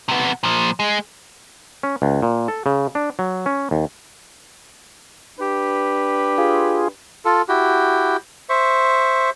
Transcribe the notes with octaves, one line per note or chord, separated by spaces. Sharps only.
C3 B3
A#2 F3
G#3
C#4
C#2
A#2
A4
C#3
D4
F#3
C#4
D#2
D4 G4 B4
F4 G#4
F4 A4
E4 F#4 G4
C5 E5 C#6